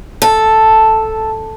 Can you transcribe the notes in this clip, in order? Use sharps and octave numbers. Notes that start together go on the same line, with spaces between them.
A4